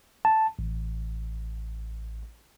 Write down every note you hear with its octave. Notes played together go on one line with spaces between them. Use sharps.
A5
A1